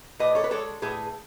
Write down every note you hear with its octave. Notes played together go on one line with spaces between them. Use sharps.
A2 B4 D#5
A4 C#5
B4
G#3 A4 C#5
A2 G#4 B4